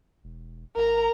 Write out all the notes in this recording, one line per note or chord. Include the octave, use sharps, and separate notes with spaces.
E1
G#1 A#4 A#5